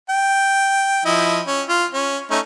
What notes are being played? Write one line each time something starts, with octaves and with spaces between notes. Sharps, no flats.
G5
F3 E4 D#5
C#4
F4
C#4
A3 C#4 D#4